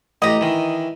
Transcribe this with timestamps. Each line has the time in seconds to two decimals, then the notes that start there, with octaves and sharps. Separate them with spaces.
0.22 A1 G4 D#5 A#5
0.41 D#3 E3